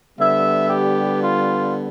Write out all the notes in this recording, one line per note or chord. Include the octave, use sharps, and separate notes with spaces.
D3 G3 B3 E5
G4
F4